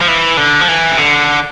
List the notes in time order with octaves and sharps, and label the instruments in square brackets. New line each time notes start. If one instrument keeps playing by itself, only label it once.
[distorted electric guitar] F3
E3
D3
F3
E3
C3
D3